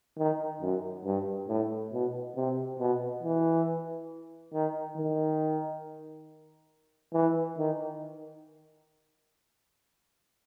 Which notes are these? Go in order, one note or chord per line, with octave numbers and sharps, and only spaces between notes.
D#3
F#2
G2
A2
B2
C3
B2
E3
D#3
D#3
E3
D#3